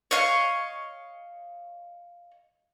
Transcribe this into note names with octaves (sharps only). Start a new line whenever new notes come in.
C#5 D#5 F5 C#6